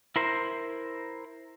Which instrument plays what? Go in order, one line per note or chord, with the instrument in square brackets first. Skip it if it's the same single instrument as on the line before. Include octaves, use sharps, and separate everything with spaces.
[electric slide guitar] E4 A#4 C5